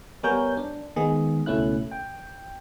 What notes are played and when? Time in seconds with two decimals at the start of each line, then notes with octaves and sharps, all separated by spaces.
0.23 G3 B3 A#4 C#5 G#5 G6
0.57 D4
0.96 D#3 G#3 B3 G#4
1.46 C#2 B2 A3 C#4 E4 F#6
1.91 G5